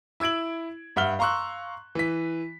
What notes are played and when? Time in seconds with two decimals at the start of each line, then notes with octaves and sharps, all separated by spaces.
0.20 E4 E6 G#6 D7 F#7
0.96 G2 E5 F#5 F6 G7
1.19 F5 A#5 C6 C#6 E6 F#6
1.95 E3 B6